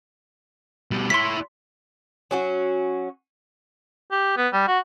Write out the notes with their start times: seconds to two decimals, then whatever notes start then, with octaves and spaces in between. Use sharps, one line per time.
0.91 B2 G3
1.10 E4 C#5 C6 B6
2.31 F#3 C#4 F#4
4.11 G4
4.37 B3
4.53 G3
4.68 F#4